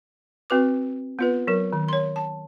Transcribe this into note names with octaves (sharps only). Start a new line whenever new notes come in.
C4 F#4 B4 D6
B3 F4 B4
F#3 A#4
D#3
C#5 C6
A5